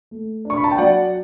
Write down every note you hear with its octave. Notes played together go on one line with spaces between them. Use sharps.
A3
D4 C#6
B5
A5
G5
F#3 D5 F#5